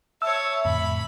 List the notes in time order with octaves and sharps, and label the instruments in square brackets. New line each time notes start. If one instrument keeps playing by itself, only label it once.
[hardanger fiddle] C#5 A5 [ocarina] E5 [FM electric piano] E6
[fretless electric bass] F2 A2 D3 [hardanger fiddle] B5